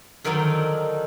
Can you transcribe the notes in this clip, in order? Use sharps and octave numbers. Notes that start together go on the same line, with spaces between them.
D3 D#3 F3 F#3 D4 D#4